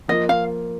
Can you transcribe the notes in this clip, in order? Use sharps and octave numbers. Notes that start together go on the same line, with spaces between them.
F3 A#3 F4 D#5
F5